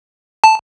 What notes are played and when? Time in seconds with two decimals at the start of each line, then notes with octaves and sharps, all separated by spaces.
0.44 A5